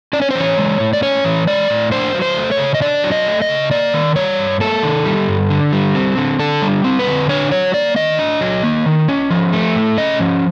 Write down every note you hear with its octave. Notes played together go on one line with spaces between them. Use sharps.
C#4 D5
C#5
C5
E3 C#5
G#3
A2
D5
C#4 C#5
E3
G#3 D5
A2
D4 C5
F#3
C5
A3
C#5
C#3
D#5
D4 D5
F#3
D#5
A3
D#5
C#3
A#3 D5
D#3
G3 C#5
G2
A#3 A4
D#3
G3
G2
D3
G3
C4
D3
D3 A4
G3
C4
B4
D3
D4 C#5
F#3 C#5
A#3 D5
D#3 D#5
D4
F#3
A#3
D#3
C#4
F3
A3
A2
C#4 D#5
F3